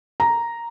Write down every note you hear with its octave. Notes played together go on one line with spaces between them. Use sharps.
A#5